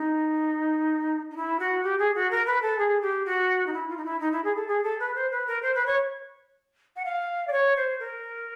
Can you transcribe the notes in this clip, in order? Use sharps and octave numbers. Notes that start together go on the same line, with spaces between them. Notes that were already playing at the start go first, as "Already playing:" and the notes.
Already playing: D#4
D#4
E4
F#4
G4
G#4
F#4
A#4
B4
A4
G#4
G4
F#4
D#4
E4
F4
D#4
E4
D#4
E4
G#4
A4
G#4
A4
B4
C5
B4
A#4
C5
B4
C#5
F#5
F5
D5
C#5
C5
A#4